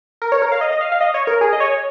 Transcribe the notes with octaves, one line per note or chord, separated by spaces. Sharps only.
A#4
C#5
A#4
F5
D#5
D#5
F5
F5
D#5
C#5
A#4
G#4
D#5
C#5